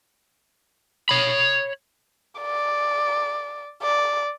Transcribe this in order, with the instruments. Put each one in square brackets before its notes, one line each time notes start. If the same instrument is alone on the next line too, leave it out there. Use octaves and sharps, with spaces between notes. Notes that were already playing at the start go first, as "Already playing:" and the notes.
[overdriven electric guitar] C#5 B5
[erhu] D5
D5